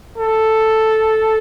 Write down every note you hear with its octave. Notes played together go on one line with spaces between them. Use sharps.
A4